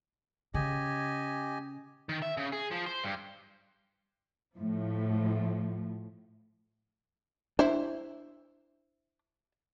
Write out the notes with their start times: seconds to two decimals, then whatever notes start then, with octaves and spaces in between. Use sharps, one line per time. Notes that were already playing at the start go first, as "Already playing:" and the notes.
0.54 C#3 G4 D#5 G#5
2.09 D#3
2.22 E5
2.37 C#3
2.53 G#4
2.71 F3
2.86 C5
3.04 G2
4.56 A2 F3 A3
7.59 D4 E4 C5